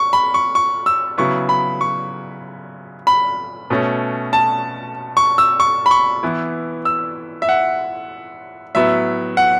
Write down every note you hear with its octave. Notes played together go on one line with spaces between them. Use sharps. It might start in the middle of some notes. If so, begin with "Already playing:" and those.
Already playing: C#6
B5
C#6
C#6
E6
C#3 F#3 B3 E4 C#6
B5
C#6
B5
B2 A3 C#4
A5
C#6
E6
C#6
B5
C#6
E3 B3 E4
E6
E5
F#5
A2 F#3 B3 E5
F#5